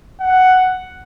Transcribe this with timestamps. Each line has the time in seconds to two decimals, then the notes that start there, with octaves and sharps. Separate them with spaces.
0.21 F#5